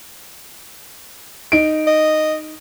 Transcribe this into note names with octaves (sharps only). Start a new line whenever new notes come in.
D#4 D7
D#5